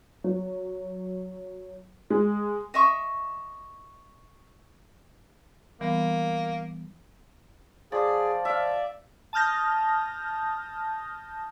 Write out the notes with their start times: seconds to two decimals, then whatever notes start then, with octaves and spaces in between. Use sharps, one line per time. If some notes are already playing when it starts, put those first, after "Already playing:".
0.24 F#3
2.10 G#3
2.74 D#5 E5 C#6
5.81 E3 G3 A#3 B3
7.92 F3 G#4 D5
8.45 D5 E5 F5
9.33 A5 D#6 F6 G6 A#6